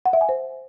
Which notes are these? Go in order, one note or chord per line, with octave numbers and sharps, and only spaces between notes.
F#5
E5
G#5
C5